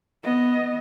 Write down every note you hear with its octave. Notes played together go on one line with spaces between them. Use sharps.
B3 D#5